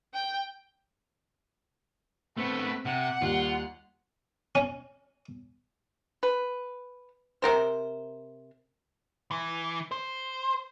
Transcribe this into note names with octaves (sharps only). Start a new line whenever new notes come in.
G5
A3 B3 C4 B4
C3 F#5
D#2 G3 F4
C#4
B4
C3 B3 A#4 C5
E3
C5